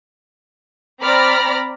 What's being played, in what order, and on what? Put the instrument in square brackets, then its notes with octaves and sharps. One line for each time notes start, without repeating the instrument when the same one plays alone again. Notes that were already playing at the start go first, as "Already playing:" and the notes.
[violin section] C4 D5 A#5 B5 F6 A#6